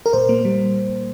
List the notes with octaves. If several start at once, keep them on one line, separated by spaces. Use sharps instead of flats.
A#4
A#2 C5
A#3
G3